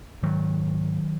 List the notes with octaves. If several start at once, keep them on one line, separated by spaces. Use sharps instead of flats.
G#2 D#3 F#3